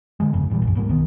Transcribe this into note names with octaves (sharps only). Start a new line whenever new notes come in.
D3 F3 G#3
G1 F2 C#3
G#1 A#2 E3 G3
C2 F#2
C#2 G#2 G3 A#3
C2 B2 D#3 B3